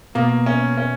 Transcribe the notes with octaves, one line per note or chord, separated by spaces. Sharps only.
B2 A#3
C#4
C#4